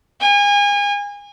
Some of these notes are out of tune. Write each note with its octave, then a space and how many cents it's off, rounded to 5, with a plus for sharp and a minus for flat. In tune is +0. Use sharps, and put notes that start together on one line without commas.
G#5 -30